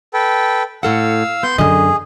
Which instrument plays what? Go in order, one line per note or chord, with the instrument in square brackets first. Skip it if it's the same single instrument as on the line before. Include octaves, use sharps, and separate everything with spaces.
[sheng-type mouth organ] A4 B4 G5
[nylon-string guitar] A2 A4 F#5 [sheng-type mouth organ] F5 E6
[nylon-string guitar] B3 [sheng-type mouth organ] C6 G6
[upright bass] F#2 D3 [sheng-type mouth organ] G#4 [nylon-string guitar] D#5